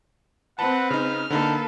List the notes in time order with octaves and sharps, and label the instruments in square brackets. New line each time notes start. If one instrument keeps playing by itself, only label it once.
[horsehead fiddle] C4 [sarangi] B4 [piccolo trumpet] F#5 [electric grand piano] A5
[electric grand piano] C#3 D#4 [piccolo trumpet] F6
[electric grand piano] D3 D#4 [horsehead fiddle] A#3 A4 [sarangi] B4